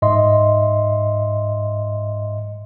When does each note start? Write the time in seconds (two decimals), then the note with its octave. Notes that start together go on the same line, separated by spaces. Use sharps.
0.02 G#2 D#5 E5 C6